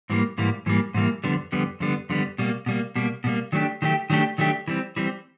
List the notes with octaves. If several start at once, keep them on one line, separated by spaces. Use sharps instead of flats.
G#2 E3 G3 A#3
G#2 E3 G3 A#3
G#2 E3 G3 A#3
G#2 E3 G3 A#3
F2 D3 G3 B3
F2 D3 G3 B3
F2 D3 G3 B3
F2 D3 G3 B3
B2 G3 A#3
B2 G3 A#3
B2 G3 A#3
B2 G3 A#3
D#3 F#3 A3 D4 G4
D#3 F#3 A3 D4 G4
D#3 F#3 A3 D4 G4
D#3 F#3 A3 D4 G4
E3 G3 C4
E3 G3 C4